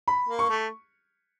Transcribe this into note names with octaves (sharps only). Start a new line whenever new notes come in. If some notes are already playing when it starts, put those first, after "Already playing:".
B5
A#3
C#6
A3